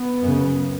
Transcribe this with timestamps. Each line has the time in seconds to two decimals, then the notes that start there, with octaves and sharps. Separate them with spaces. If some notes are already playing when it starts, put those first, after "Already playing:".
Already playing: B3
0.22 F#2 C#3